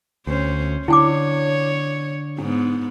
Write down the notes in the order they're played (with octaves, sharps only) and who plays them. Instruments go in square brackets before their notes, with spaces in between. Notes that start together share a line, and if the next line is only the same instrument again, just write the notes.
[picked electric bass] D2 [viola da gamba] C#4 C5
[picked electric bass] D3 [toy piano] E4 G#5 D6 [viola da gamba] C#5
[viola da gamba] G#2 B3 [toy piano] D4